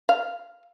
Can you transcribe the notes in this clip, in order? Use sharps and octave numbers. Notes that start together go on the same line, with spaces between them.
F5